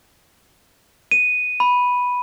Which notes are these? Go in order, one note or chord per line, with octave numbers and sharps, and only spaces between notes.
D#7
B5